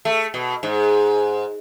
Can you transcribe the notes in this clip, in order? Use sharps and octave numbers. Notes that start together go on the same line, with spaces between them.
A3
B2
G#2